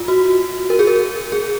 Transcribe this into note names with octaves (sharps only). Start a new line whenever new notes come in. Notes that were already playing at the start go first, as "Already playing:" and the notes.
Already playing: F4
F#4
A#4
G#4
A#4
G#4